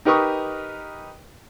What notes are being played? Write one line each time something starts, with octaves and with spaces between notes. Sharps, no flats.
D#4 G4 A#4 B4 C#6 D#6